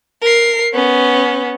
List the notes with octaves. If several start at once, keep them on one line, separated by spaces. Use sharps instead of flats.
A#4 C7
B3 C#4